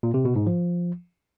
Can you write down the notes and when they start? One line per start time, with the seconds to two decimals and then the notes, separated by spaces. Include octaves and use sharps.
0.03 A#2
0.14 C3
0.25 B2
0.36 G#2
0.47 F3